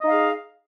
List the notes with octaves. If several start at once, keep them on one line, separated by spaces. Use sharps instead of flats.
D#4 G#4 D#5 F5